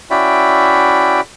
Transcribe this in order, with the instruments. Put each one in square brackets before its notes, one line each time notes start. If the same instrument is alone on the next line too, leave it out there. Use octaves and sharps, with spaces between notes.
[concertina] C#4 E4 F#4 D5 E5 G5